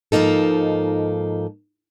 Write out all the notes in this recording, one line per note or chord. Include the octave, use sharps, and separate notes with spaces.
G#2 F3 A#3 D#4 A4